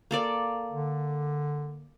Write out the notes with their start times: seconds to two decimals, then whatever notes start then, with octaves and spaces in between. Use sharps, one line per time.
0.11 A#3 A4 D5
0.71 D3